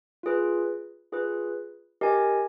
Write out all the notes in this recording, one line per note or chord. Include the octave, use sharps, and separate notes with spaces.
F4 G#4 B4
F4 G#4 B4
G4 A#4 D#5 G#5